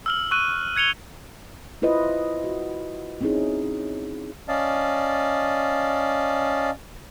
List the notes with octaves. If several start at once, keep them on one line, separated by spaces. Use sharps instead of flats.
E6 F6 F#7
C#6 E6 F#6 D#7
F#6 G#6 C#7 F7 G7
E4 F4 B4 C5 D#5
F#4
C4 C#4 D#4 E4 G#4
C#4 D5 D#5 F5 A5